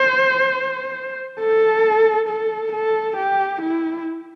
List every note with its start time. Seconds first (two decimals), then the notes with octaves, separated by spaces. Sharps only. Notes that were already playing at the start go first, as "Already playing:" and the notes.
Already playing: C5
1.39 A4
2.29 A4
2.73 A4
3.17 G4
3.62 E4